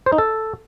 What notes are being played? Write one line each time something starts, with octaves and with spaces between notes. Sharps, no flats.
C5
D#4
A4